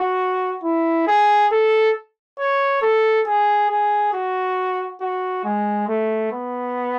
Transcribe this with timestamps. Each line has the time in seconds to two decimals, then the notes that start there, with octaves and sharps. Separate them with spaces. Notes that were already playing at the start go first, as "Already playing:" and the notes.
Already playing: F#4
0.63 E4
1.07 G#4
1.51 A4
2.39 C#5
2.82 A4
3.26 G#4
3.70 G#4
4.13 F#4
5.01 F#4
5.44 G#3
5.88 A3
6.32 B3